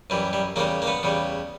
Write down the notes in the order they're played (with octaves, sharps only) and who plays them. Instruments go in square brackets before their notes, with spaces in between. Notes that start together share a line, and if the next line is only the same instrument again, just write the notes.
[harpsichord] F#2 E3 G3
G3
E2 C#3 G3 A#3
A#3
B3
E2 C#3 G3